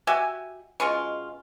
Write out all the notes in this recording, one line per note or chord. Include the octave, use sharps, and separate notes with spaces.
F#4 G4 E5 G#5
B2 G#3 C#4 F4